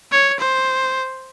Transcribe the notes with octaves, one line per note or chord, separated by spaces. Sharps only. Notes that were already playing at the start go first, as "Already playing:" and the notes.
C#5
C5